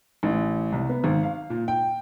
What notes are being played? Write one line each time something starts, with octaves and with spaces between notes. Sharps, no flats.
A1
C2
B3
G#1
F5
A#2
G5